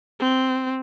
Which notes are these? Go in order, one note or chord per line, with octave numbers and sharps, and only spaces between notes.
C4